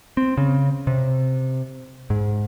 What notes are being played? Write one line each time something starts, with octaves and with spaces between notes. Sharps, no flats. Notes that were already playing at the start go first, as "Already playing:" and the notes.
C4
C#3
C3
G#2